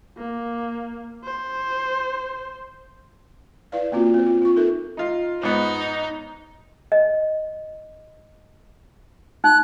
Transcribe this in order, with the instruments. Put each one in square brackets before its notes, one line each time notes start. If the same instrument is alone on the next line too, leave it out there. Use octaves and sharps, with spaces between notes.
[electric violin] A#3
C5
[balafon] E4 B4 D5 F5
A#3 C4 C#4 F4 F#4
C4 C5
F4
F4 C#6
D#4 A4 A#4 E5
[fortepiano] D#4 F4
[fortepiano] G#2 B3 [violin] D#4
[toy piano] D#5
[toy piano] D#4 [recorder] F#6